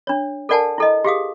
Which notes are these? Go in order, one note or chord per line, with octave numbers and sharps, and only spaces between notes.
D4 C#5
A4 A#4 D5 F#5 G#5 A5
E4 A4 D#5
G4 G#4 F5 D#6